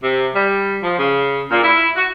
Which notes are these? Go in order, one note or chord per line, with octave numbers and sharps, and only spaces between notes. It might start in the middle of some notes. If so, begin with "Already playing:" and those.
C3
G3
F3
C#3
A#2
E4
F#4